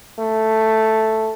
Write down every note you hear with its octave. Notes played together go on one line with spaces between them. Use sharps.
A3